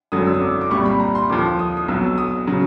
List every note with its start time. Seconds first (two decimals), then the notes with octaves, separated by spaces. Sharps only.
0.12 G#1 F#2 D3 F#3 D#6
0.27 E6
0.34 D#6
0.41 D6
0.61 D6
0.71 C2 A#2 G3 C#6
0.85 B5
1.00 A#5
1.15 C6
1.29 D#2 D3 F3 D6
1.59 D#6
1.77 D#6
1.88 B1 B2 F#3 E6
2.18 D#6
2.47 C#3 F#3